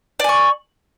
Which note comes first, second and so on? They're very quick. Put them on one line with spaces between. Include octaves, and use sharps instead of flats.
D5 G#5 C#6